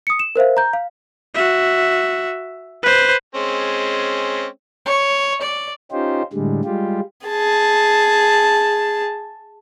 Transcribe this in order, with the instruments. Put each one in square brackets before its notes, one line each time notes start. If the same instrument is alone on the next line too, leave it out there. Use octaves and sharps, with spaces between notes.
[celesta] D#6 C#7
E7
A#4 C5 E5 F5
A#5 G6
F5
[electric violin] F#4 E5
B4 C5
[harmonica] G#3 C4 C#4
[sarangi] C#5
D5
[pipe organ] C#4 D#4 F4 G4 C5
A2 D3 G3 G#3
G3 G#3 F4 G4
[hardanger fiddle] G#4 A5